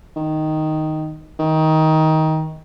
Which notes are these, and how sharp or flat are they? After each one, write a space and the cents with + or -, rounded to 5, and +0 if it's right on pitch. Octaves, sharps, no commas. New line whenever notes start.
D#3 +0
D#3 +20